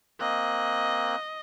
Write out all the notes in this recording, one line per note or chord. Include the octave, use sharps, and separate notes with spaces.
A#3 C4 D#5 F#6